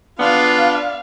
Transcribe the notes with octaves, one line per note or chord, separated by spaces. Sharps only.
B3 D4 F4 F5